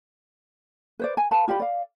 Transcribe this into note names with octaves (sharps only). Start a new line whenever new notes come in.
B4 C5 D5
G#5
B4 F5 A5 B5
F4 G4 D5 B5
D5 F5